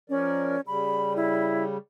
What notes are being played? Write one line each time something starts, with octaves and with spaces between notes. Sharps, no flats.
F3 C#4 A#4 D5
C#3 G3 B5
E4